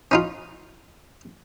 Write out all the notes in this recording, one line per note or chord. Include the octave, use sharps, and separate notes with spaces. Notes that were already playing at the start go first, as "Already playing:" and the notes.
C#4 D#4 F4